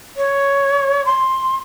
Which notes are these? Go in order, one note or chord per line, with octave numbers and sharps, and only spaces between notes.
C#5
C6